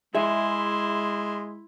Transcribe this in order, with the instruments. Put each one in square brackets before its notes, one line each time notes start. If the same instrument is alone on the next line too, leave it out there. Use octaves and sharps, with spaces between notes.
[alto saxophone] G#3 [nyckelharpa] E4 C6 [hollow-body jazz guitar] G#4 E5